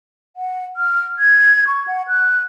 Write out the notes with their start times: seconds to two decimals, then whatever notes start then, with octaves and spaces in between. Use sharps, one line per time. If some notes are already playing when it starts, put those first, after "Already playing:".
0.36 F#5
0.76 F6
1.18 G#6
1.67 C#6
1.87 F#5
2.08 F#6